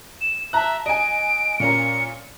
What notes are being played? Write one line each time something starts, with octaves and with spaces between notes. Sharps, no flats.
E7
E5 A5 A#5 F#6
D#5 G#5 D7
A#2 C#4 A#4 C#7